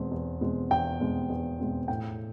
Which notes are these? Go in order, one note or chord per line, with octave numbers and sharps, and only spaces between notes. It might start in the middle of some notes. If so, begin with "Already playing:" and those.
Already playing: E2 B2 G#3 C4
E2
B2 G#3 C4
E2 G5
B2 G#3 C4
E2
B2 G#3 C4
A2 G5